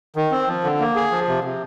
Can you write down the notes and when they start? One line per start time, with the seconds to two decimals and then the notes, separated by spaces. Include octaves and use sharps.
0.16 D#3
0.31 C4
0.48 F3
0.64 D3
0.80 A#3
0.95 G#4
1.12 F3
1.28 C3
1.44 C3